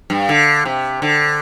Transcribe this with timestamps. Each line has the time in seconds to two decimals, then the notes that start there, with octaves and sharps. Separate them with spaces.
0.10 G2
0.29 D3
0.65 C3
1.02 D3